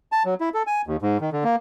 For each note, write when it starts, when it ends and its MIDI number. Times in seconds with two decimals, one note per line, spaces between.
0.12 0.23 81
0.25 0.34 54
0.41 0.49 64
0.54 0.63 69
0.67 0.82 80
0.87 0.97 39
1.02 1.18 44
1.21 1.30 51
1.32 1.44 50
1.44 1.56 58